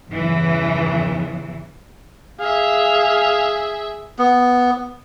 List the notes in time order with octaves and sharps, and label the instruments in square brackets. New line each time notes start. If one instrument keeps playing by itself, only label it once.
[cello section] E2 G2 C#3 E3
[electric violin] G#4 E5 [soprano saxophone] F5
[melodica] B3